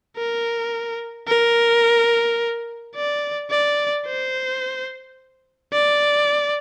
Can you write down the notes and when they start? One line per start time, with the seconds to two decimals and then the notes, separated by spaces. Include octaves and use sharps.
0.17 A#4
1.28 A#4
2.95 D5
3.51 D5
4.07 C5
5.73 D5